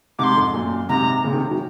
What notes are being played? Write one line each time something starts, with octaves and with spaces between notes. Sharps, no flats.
G#2 C3 C6 D6
F2 G#2
F#2 A#2
G#2 C3 A#5
A#2 C#3
C3 D#3
D#3 F#3